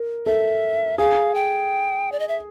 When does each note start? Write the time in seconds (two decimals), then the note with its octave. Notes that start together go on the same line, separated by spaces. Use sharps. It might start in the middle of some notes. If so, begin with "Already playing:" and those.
Already playing: A#4
0.26 A4 E5
0.98 G#4 F5
1.34 G5
2.12 D5
2.20 D#5
2.28 E5